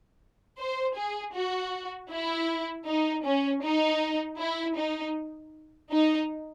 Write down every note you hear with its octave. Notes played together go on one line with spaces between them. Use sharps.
C5
G#4
F#4
E4
D#4
C#4
D#4
E4
D#4
D#4